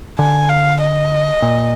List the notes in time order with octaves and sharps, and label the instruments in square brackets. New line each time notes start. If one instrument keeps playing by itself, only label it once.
[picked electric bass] D3 [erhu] G#5
[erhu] F5
D#5
[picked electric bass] A#2